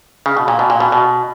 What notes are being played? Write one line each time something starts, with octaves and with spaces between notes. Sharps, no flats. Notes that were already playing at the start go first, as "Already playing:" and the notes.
C#3
B2
A#2
B2
A#2
B2
B2